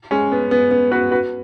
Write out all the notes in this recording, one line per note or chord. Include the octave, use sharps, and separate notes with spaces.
G#3 C#4
B3
B3
B3
F#4 B4
F#4 B4